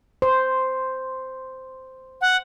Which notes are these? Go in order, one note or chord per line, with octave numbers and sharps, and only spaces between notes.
C5
F#5